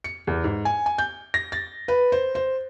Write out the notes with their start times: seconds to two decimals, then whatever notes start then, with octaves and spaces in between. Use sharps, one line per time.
0.04 C#7
0.27 E2
0.44 G#2
0.65 G#5
0.86 G#5
0.98 G6
1.34 A#6
1.52 A6
1.88 B4
2.12 C5
2.35 C5